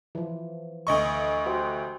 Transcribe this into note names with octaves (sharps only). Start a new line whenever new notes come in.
E3 F3
D2 D#5 C#6
F#4 G4 C5